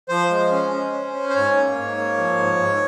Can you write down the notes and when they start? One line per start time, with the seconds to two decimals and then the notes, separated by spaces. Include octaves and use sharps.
0.09 F3 C5
0.31 G#3
0.52 C#4
0.72 C#4
0.93 C#4
1.13 C#4
1.29 C5
1.34 G#2 C#5
1.55 A#3
1.77 G#2
1.97 A#3
2.17 F3
2.38 G#2
2.59 G#2